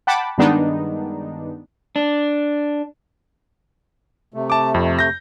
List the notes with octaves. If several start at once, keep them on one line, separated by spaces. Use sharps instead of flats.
F#5 G5 A5 B5 D6
G2 D#3 G#3 B3 D4 D#4
D4
C3 A3
A5 D6
F2
G6 A#6